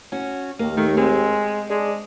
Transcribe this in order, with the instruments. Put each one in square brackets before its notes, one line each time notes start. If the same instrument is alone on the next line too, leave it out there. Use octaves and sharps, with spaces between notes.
[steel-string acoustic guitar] C#4 F#4
[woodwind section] D#2 [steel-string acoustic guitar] A#3
[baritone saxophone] D#3 [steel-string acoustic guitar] A3
[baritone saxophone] G#3 [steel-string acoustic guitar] C4
[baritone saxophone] G#3 [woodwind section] D4 G#4